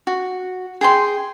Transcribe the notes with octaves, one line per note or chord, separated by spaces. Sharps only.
F#4
G#4 G5 A#5 C6